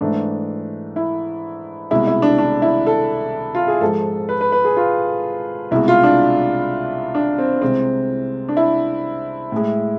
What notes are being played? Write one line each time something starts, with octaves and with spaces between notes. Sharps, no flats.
G#2 E3 A3 D4
E4
C2 B2 G#3 E4
E4
D4
D4
E4
A4
F4
G#4
G#2 F3 G#3 A4
B4
B4
B4
G#4
F4
C2 B2 G#3 E4
F4
D4
D4
C4
C2 C3 G#3 C4
D4
E4
A2 G#3